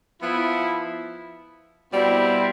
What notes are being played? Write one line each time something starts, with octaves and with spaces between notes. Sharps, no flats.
F3 B3 E4
B2 G3 C4 E4